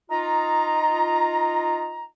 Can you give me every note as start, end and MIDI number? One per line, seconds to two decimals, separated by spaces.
0.11 2.05 63
0.11 2.05 65
0.11 2.05 82